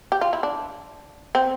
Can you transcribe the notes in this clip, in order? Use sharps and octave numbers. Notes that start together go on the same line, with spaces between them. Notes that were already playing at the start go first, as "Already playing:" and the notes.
G4
F4
E4
D4
C4